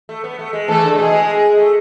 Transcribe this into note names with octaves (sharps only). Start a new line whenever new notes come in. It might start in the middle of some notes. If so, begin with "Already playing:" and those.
A3
B3
A3
G#3
E3 A3 A4
D3
B2 G#4
G#3
A3